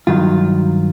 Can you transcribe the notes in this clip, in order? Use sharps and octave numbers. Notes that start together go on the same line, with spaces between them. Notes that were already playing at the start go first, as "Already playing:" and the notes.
G2 D#3 F#3 F4